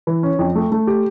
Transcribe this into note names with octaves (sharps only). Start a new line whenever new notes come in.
E3
C#4
F2
A3
A3
G4